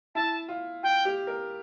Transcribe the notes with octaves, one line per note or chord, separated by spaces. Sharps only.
E4 A5
F4
F4 G5
G4
A#4